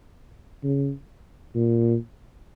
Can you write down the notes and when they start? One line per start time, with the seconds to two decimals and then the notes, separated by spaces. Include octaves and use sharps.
0.64 C#3
1.55 A#2